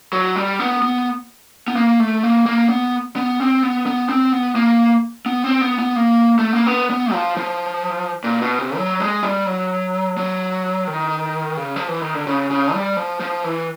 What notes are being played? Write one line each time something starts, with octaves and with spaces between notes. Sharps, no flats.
F#3
G3
B3
B3
B3
A#3
A3
A#3
A#3
B3
B3
C4
B3
B3
C4
B3
A#3
B3
C4
B3
B3
A#3
A3
A#3
B3
B3
F3
F3
A#2
B2
C3
F#3
G#3
G3
F#3
F#3
D#3
C#3
F3
E3
D#3
D3
C#3
C#3
G3
F3
F3
E3